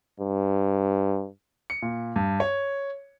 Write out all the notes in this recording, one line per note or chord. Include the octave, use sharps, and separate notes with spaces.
G2
C#7
A#2
G2
C#5